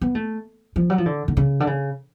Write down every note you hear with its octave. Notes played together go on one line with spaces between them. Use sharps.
B3
A3
F3
F#3
F3
D3
D3
C#3
D3
C#3